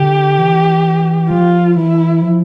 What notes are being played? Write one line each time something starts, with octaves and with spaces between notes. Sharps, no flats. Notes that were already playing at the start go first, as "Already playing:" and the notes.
Already playing: D3 G4
E3
F3 F4
E3 E4
F3